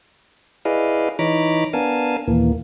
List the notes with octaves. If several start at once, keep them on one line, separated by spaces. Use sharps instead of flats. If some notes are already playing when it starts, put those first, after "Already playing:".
E4 G#4 B4 D5 D#5 F5
E3 D#4 C#5 A#5 B5 D6
B3 D4 A#4 F5 G#5 A5
D#2 A#2 E3 A#3